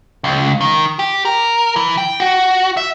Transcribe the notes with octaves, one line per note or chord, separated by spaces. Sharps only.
C#2
D#3
G4
A#4
E3
G5
F#4
E5